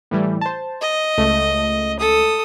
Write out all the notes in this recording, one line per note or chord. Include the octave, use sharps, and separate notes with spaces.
A2 E3 G3
C5 A5
D#5
C#2 A3
A4 D#6